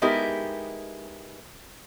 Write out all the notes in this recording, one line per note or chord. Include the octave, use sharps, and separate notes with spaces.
G#3 B3 D#4 E4 G4 A#4